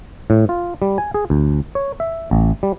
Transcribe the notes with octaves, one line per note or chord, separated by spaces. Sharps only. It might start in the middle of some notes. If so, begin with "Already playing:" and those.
A2
F4
G3
G#5
G#4
D2
C#5
E5
A1
G3